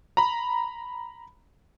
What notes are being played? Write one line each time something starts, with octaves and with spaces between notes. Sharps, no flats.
A#5 B5